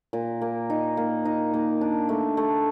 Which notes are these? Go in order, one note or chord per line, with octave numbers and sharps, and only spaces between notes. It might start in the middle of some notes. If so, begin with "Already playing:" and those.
A#2
A#3
D#4
A#3
D#4
A#3
D4
A3
A3